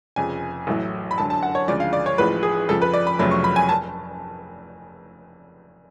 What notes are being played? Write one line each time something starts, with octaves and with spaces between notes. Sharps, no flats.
F1 F2 C#3 G#5
A1 A2 F#3 A3
B5
F#2 D3 F#3 A5
A5
F#5
C#5
D2 C#3 F3 G#3 D5
F5
D5
C#5
A1 A2 F3 G#3 B4
G#4
F2 C#3 F3 A4
B4
D5
B5
F1 F2 C#3 F#3 A3 B5
C#6
B5
G#5
A5